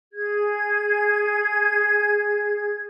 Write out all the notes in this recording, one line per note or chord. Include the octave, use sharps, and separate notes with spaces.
G#4 G#6